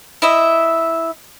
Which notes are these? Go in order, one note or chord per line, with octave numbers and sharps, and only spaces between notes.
E4 D#5 E5